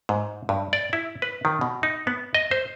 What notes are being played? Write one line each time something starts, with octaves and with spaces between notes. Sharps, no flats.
G#2
G2
D5
E4
B4
D#3
B2
D#4
B3
D#5
C5